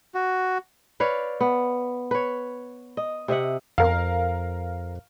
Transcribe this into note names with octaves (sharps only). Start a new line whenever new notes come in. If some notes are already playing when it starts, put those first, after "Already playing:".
F#4
B4 C#5 D5 F5
B3
B4 C#5
D#5
C3 D#5 E5 F#5
F2 A#4 F5